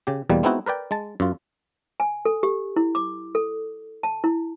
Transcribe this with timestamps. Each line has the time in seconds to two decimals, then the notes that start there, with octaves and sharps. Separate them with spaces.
0.07 C#3 G4
0.30 E2 B2 G3 A#3
0.43 G#3 B3 C4 D#4 E4 F#4
0.66 A#4 B4 D5 G5
0.91 G#3 A5
1.20 F#2 F4
2.00 G#5
2.25 A4
2.43 G4
2.76 E4
2.95 D6
3.35 A4
4.03 A5
4.24 E4